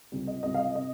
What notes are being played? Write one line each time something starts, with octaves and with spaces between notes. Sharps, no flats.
C#2 C3 G3
D#5
C#2 C3 G3 D#5
F5
D#5
C3 D#5